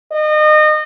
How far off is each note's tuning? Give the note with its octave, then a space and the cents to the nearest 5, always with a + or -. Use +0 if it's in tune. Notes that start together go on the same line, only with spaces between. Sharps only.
D#5 -30